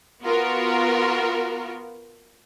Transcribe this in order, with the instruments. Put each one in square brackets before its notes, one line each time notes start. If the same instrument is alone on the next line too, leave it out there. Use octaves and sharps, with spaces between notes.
[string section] B3 F4 F#4 A#4